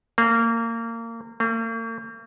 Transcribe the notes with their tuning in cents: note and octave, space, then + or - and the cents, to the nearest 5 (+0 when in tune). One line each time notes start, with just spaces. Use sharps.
A#3 -25
A#3 -45